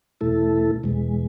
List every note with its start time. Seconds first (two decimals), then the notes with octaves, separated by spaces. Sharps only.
0.21 E2 B2 A3 E4 A4
0.83 E2 B2 G#3